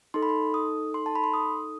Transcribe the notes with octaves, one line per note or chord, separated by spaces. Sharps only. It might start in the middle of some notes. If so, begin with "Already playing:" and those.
D#4 A4 C6
B5
C6
D#6
C6
A5
B5
C6
D#6